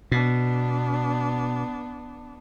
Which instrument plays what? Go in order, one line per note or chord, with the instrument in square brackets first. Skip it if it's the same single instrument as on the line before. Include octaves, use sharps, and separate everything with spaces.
[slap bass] B2 [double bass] B3 D4